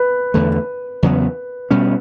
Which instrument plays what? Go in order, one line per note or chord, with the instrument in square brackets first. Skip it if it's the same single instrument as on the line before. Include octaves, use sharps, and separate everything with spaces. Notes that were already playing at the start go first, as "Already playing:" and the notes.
Already playing: [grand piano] B4
[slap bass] E2 D3 A3
E2 C#3 F#3 B3
B2 G3 C#4